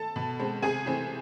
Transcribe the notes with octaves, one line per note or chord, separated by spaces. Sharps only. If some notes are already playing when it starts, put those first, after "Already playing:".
Already playing: A4 A5
B2
G#3 C4
C3 G#4 G#5
E3 A3 C4